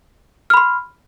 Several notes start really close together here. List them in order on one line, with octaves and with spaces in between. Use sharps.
F6 B5 C6